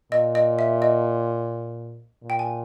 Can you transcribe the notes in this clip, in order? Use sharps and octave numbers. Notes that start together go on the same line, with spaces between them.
A#2 D#5
D#5
E5
D#5
A#2
G5
G#5